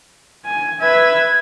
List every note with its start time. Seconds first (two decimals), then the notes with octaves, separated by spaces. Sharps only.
0.45 G#5
0.80 B4 E5 G#6